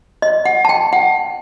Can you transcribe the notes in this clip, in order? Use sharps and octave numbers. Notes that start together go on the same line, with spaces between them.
D#5
F#5
A5
G5
F#5